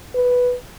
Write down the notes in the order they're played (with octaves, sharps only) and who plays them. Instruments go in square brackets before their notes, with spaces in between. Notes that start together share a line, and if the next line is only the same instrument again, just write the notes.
[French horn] B4